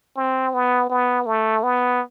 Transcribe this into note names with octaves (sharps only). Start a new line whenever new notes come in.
C4
B3
B3
A3
B3